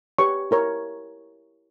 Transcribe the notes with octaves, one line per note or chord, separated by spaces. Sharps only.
G4 B4 C#5 C#6
E4 A#4 C#5